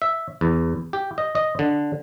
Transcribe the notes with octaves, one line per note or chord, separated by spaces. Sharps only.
E5
E2
G4
D#5
D#5
D3